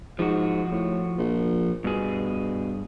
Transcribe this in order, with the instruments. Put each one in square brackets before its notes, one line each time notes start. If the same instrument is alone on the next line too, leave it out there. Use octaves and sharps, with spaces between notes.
[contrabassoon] G#2 [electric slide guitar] F3 F#4
[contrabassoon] A2
A#1
[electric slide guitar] G2 G#4 [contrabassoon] B2